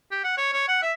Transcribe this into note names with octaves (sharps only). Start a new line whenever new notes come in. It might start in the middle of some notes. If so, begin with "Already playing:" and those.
G4
F#5
C#5
C#5
F#5
E5